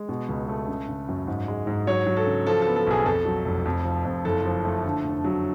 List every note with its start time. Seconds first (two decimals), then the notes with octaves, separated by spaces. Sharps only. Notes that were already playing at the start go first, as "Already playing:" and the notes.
Already playing: G#3
0.09 B2
0.29 C#2
0.48 A3
0.68 C#3
0.89 C#3
1.08 F#2
1.27 G#2
1.48 G#3
1.67 G#2
1.87 F#3 C#5
2.07 F#3
2.17 A4
2.26 C#3
2.47 F3 A4
2.62 B3 A4
2.76 A4
2.87 B1 G#4
3.06 F2 A4
3.25 F#3
3.45 F1
3.66 F2
3.85 F3
4.05 F2
4.25 F#1 A4
4.45 F3
4.65 A3
4.84 D3
5.05 F1
5.24 F#3